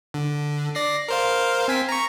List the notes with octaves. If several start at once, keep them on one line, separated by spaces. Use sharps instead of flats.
D3
D5 A#6 C7
A#4 C5 F5
C4 G#5 B6
A#5 C#6